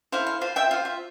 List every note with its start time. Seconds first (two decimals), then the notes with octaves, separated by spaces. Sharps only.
0.12 E4 A4 C5 F5
0.27 F5
0.41 F4 C5 F5
0.56 E5 G5
0.71 F4 C5 F5
0.85 E5